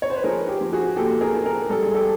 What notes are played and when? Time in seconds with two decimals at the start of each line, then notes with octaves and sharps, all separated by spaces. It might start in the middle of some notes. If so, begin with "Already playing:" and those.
0.02 C#5
0.10 C5
0.16 B4
0.24 F3 G#4 A#4
0.48 G4
0.61 F3
0.73 F#4 G#4
0.96 A#2 G4 A4
1.21 G#4 A#4
1.33 F3
1.45 G#4 A#4
1.69 G3 A4
1.82 G#4
1.94 G4 A4